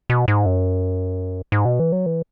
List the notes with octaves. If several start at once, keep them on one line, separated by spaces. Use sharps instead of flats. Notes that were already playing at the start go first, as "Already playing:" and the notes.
B2
G#2
F#2
G#2
B2
E3
F#3
E3